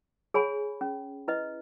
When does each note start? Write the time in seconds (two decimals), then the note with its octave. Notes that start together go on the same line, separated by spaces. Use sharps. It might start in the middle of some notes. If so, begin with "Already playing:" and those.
0.34 G#4 C#5 G#5 B5
0.81 C#4
1.28 E4 B4 D#5